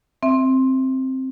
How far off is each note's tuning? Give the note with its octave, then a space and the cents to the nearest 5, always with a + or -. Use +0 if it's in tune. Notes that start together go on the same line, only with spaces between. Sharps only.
C4 +5 E5 +0